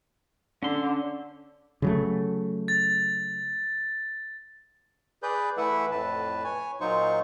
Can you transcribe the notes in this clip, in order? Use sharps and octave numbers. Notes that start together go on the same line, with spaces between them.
D3 C#4 C6
C#3 F#3 A3
A6
G#4 B4 D5 G6
E3 A3 E4 B4 E5 F#5
F2 A2 B4 A5
C#5 G#5
A#2 F#3 D#4 F4 C5 C#6